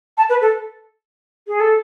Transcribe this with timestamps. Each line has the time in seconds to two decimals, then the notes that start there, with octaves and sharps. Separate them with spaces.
0.17 A5
0.29 B4
0.41 A4
1.47 G#4
1.60 A4